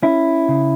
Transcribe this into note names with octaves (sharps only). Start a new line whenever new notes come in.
C#4 E4
C#3